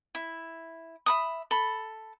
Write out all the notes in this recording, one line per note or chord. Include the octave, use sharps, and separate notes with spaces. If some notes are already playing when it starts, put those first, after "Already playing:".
E4
E5 B5 D#6
A4 B5